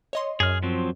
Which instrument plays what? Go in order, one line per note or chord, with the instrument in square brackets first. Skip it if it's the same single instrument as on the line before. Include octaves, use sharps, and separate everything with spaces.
[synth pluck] C#5 D#5 C6
[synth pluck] F#2 [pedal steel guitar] G#4 F6
[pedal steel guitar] F3 F#3 C4